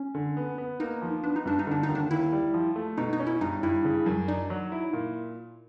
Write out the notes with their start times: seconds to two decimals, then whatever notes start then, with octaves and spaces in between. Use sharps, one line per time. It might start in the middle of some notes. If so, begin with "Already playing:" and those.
Already playing: C#4
0.15 D3
0.37 B3
0.58 B3
0.80 A#3 D#4
1.02 F3
1.23 B3 D4
1.36 D#4
1.45 G2 D4
1.59 D#4
1.67 D3 D4
1.83 D#4
1.88 D#2
1.95 D4
2.10 D#2 E4
2.32 G3
2.54 F3
2.76 A3
2.97 B2 D#4
3.13 D#4
3.20 C#4
3.26 E4
3.41 G2 D#4
3.63 G2 E4
3.84 C#3
4.06 F#2
4.28 D4 D#4
4.50 F#3
4.72 E4
4.93 A#2